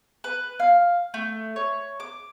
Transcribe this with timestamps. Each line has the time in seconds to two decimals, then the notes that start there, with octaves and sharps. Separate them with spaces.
0.24 B4
0.59 F5
1.14 A3
1.56 C#5
2.00 D6